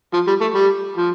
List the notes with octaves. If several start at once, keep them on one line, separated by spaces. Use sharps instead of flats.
F3
G3
A3
G3
F3